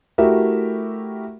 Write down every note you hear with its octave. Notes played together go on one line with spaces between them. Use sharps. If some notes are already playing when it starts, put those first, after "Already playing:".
A3 E4 F#4 G4 A#4 E5